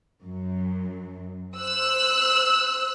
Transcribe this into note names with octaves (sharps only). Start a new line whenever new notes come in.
F#2
C5 E6 F#6